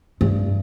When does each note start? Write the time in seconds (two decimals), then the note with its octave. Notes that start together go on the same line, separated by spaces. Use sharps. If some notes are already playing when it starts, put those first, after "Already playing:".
0.21 G2